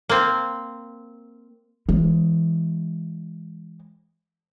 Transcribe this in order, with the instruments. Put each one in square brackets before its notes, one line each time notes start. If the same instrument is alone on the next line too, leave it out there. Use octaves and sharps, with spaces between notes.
[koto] A#3 C4
[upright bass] E3 G#3